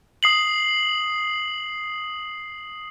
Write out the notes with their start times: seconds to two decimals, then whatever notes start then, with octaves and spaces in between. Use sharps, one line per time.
0.23 D#6 C7 F#7